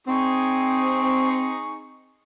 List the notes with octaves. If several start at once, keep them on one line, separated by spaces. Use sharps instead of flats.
C4 D#4 G#4 C#6